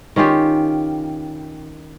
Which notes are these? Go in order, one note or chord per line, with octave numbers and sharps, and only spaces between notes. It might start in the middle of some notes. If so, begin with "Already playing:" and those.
D#3 C#4 F4 G4